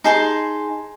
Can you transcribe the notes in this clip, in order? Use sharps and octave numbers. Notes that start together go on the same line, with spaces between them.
D#4 G#4 A5 C6